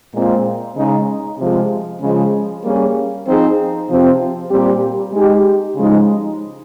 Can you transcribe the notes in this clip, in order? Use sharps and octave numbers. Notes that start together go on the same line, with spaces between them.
A#2 G#3 C4 F4
C#3 G#3 D#4
C3 F3 G#3
C#3 F3 G#3
G3 A#3 C#4 G#4
F3 C4 D#4 G#4
C3 F3 C4 G4
A#2 G3 C4 G4
G#3 D#4 G4
C#3 F3 G#3 D#4